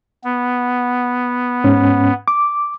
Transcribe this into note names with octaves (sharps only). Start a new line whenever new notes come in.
B3
G#2 C#4
D6